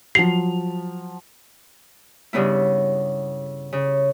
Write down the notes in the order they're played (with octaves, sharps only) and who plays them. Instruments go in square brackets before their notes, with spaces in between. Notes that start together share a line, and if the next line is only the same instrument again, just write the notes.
[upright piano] F3 F#3 F7 [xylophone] C7
[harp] G2 C#3 B3 E4
C#3